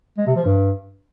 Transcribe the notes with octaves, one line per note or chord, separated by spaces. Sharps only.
G#3
C3
F3
G2